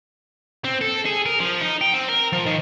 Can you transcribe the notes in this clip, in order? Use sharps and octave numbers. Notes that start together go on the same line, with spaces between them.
C4
A4
G#4
A#4
F3
D#4
G5
C4
A#4
F3
D#3